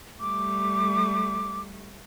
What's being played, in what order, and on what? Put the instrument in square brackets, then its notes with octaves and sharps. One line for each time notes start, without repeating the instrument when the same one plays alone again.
[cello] G3 A3 [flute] D6